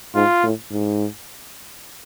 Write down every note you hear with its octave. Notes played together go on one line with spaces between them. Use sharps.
G#2 F4
A2
G#2